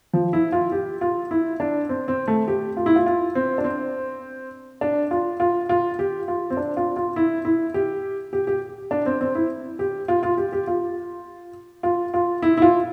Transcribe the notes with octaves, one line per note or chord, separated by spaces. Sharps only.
F3
E4
F4
G4
F4
E4
D4
C4
C4
A3
G4
F4
E4
F4
F4
C4
D4
C4
D4
F4
F4
F4
G4
F4
C4
D4
F4
F4
E4
E4
G4
G4
G4
D4
C4
C4
E4
G4
F4
F4
G4
G4
F4
F4
F4
E4
E4
F4